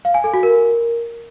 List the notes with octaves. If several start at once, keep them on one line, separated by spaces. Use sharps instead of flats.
F5
G#5
A4
F#4
A#4